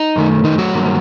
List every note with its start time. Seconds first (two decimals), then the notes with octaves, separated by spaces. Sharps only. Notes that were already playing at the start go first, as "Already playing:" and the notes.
Already playing: D#4
0.16 F#2 D#3 A3
0.44 D#3 D#4
0.58 F#3 F#4
0.73 G2 D#3 G3 A#3